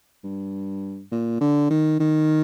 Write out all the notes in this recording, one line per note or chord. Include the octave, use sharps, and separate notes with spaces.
G2
A#2
D3
D#3
D#3